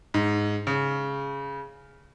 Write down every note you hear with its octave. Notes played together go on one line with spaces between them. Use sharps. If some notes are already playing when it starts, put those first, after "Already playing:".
G#2
C#3